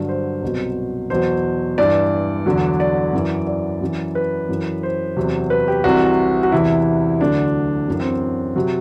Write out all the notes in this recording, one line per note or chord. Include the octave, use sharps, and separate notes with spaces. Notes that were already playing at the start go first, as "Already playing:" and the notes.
Already playing: G2 D3 F#3
C5
C2 B2 F#3
E2 B2 F#3 C5
G2 E3 D5
E2 D3 F#3
D5
F#2 E3
D5
F#2 E3
B4
F#2 E3
C5
E2 C3 F#3
B4
G4
C2 C3 E3 F#4
F#4
E2 C3 E3 E4
D2 D3 F#3 D4
F#2 E3
C4
C3 F#3